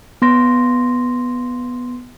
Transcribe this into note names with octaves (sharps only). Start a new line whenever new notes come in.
B3 C6 A#6